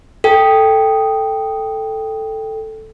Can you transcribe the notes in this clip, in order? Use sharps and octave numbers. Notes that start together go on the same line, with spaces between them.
A4 G5